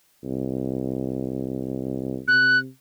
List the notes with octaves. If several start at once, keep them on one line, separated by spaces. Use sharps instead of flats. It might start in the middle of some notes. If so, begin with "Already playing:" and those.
C2
C3 F#6